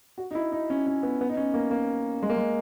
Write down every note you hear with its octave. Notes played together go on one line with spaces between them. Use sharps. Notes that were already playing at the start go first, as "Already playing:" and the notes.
F#4
D#4
E4
D#4
C#4
C#4
B3
B3
D#4
C#4
A#3
A#3
G#3
A#3
G#3